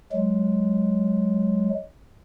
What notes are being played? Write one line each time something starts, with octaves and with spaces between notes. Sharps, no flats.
F#3 G#3